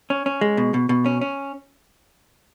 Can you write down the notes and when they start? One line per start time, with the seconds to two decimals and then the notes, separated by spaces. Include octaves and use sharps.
0.10 C#4
0.26 C#4
0.41 G#3
0.57 B2
0.74 B2
0.89 B2
1.06 C#4
1.21 C#4